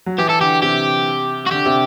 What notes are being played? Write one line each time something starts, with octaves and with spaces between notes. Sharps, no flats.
F#3
E3 G4
A4
D3 G4
C3 G4
F#4
D3 G4
C3